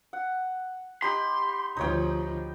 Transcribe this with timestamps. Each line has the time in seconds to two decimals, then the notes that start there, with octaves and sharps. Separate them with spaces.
0.13 F#5
1.02 D#4 G4 B5 C6
1.77 D2 F3 D#4 C#5 G5